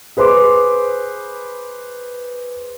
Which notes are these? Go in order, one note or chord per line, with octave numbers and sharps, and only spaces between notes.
G#4 B4 C5 C6 D6